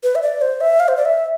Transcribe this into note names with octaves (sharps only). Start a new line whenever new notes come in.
B4
E5
D5
C5
E5
F5
C5
D5
E5